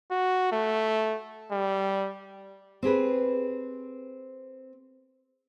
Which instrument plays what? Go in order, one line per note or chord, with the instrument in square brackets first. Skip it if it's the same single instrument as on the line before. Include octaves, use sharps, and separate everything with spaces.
[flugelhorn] F#4
A3
G3
[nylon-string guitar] C4 G4 G#4 B4